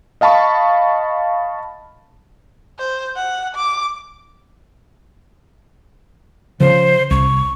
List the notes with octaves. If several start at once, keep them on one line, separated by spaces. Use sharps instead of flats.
D#5 F5 A5 B5 C#6
C5
F#5
D6
C#3 F3 C5
C2 C#6